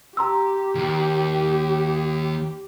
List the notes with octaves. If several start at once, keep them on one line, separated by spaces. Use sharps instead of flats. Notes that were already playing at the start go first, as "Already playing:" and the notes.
G4 A#5 C6 E6
D#2